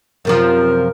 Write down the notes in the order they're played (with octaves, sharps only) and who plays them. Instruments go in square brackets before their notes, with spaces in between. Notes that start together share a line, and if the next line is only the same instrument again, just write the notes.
[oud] F#2 C3 F3 [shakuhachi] A#4